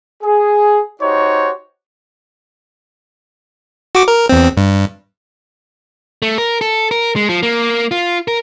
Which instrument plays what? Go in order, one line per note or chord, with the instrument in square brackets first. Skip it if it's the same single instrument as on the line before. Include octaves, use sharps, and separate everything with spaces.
[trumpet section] G#4
D#4 F#4 G4 C5 C#5
[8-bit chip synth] F#4 D6
A#4
E2 C4
G2
[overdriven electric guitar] A3
A#4
A4
A#4
G#3
F3
A#3
F4
A#4